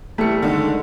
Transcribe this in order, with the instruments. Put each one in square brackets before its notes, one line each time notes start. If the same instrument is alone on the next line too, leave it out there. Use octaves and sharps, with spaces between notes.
[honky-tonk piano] E3 C#7 [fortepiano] G3 A3
[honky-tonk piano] D3 D#3 G#3